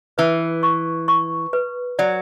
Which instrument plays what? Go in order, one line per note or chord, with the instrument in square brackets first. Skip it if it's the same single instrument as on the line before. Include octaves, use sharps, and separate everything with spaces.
[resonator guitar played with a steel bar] E3 [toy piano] B4
[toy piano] C#6
C#6
B4
[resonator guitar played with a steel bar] F#3 [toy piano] D5